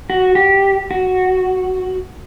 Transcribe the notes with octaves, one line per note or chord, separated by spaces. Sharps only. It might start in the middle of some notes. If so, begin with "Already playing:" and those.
F#4
G4
F#4